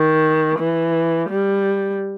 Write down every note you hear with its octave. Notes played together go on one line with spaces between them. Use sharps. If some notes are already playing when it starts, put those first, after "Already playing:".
Already playing: D#3
E3
G3